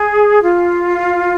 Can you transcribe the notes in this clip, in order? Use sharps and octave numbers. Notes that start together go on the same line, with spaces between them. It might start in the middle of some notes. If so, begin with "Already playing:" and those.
Already playing: G#4
F4